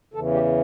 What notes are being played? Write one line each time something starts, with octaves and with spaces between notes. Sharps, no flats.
E2 C#3 E3 A4
G4